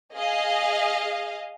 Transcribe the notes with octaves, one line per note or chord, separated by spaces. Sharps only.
G#4 D#5 F5